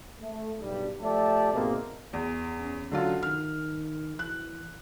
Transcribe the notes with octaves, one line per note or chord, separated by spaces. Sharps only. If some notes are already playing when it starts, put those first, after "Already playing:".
A3
B1 G2 G3
F3 A3 G4 D5 E5 A5
G#2 B2 G#3 A#3 C4
E2
C#4
D3 F#3 F4
D#3 F6
E3 F#6